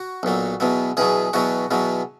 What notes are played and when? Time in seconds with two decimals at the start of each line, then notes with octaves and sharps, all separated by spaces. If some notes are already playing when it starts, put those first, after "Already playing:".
Already playing: F#4
0.23 B1 A#2 F#3
0.60 E2 B2 F#3
0.97 E2 B2 F#3 G#4
1.33 E2 B2 F#3 F#4
1.71 E2 B2 F#3